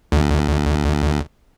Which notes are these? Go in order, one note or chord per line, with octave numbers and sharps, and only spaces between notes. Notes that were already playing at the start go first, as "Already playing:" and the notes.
D2